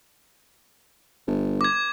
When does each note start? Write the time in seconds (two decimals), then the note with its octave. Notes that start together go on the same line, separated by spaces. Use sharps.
1.27 G1
1.61 D6 G#6